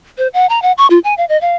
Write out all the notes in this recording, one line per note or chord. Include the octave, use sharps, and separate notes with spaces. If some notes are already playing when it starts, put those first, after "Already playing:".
C5
F#5
A#5
F#5
C#6
F4
G#5
F5
D#5
F5